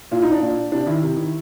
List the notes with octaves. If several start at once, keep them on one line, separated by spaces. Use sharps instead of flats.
A#2 F4
D#4
D4
A#2
C3 D4
D#3 E4
C3
D#3